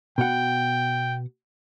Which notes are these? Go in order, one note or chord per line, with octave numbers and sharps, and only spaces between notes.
B2 F#5 G5